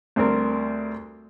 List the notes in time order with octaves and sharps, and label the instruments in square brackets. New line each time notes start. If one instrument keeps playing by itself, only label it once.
[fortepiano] D2 G3 C4 A#4